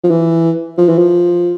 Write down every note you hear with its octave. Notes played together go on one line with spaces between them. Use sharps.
F3
E3
F3
E3
F3